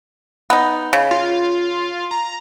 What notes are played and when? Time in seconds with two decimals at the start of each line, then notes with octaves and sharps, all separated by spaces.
0.50 B3 D#4
0.93 C#3
1.11 F4
2.11 A#5